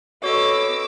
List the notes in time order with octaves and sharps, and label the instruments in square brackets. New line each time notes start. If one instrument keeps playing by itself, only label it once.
[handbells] F#4 A4 D#5 [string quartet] B4 D6 E6 [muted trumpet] C#5